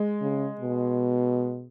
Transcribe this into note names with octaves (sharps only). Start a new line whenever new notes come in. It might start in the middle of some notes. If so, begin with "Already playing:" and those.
Already playing: G#3
C#3
B2